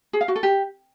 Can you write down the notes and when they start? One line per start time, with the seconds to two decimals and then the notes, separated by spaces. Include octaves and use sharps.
0.13 G#4
0.21 F5
0.28 F#4
0.36 A4
0.43 G4